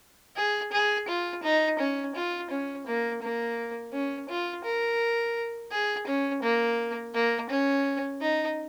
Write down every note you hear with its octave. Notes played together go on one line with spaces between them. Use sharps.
G#4
G#4
F4
D#4
C#4
F4
C#4
A#3
A#3
C#4
F4
A#4
G#4
C#4
A#3
A#3
C#4
D#4